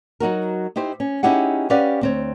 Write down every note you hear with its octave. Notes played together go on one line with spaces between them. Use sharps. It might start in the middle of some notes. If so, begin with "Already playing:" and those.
F#3 D#4 F#4 A#4
D#4 E4 G4 C5
C#4
C#4 D#4 E4 G4 G#4 F#5
C#4 G4 B4 D5 F5 F#5
D2 C4 C#5